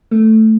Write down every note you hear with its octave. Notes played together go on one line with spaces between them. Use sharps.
A3